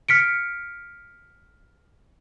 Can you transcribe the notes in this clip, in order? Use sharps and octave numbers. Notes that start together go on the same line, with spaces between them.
F6 B6 C#7 D7